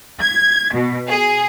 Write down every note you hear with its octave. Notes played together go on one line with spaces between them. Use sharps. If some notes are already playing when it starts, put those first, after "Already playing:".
G#6
B2
G#4